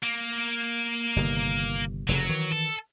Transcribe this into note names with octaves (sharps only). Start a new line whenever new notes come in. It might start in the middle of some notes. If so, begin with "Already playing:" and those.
A#3
G1 C3 D#3
F1 A2 C#3 F#3
D#3 E3
A4